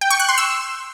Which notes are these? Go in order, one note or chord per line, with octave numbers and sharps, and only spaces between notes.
G5
C#6
F#6
C6
E6